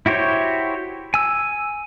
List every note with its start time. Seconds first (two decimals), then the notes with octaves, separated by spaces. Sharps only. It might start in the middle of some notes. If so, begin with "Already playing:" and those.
0.06 E4 F#4 G4 C5 C#5
1.14 G#5 E6